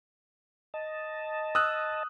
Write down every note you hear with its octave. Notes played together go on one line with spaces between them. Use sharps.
D#5 A5
D#6 E6 F#6